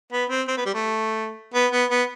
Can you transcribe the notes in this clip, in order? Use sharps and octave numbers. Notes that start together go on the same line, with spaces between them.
B3
C4
C4
B3
G3
A3
B3
B3
B3